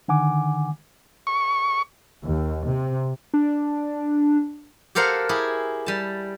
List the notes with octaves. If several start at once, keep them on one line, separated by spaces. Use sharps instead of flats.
D3 D#3 F#5 G#5 D6
C#6
D#2
C3
D4
G4 A4 A#4 C5 F5 F#5
E4 G4 G#4
G3 A5